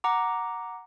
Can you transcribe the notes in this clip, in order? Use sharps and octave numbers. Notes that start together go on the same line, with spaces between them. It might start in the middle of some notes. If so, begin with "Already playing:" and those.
F#5 A#5 D6